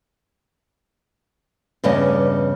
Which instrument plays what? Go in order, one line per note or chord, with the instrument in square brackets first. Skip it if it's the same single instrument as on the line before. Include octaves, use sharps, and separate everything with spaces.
[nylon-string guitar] E2 G2 C#3 D#5